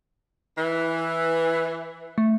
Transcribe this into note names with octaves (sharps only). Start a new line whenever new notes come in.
E3
A3